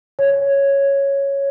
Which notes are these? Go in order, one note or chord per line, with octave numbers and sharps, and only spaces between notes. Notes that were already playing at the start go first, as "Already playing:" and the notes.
C#5